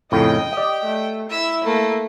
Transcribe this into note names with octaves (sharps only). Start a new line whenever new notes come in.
F2 A2 C#3 D#5 G5
G4 D5 D#5
A3
E4 E5 E6
A3 A#3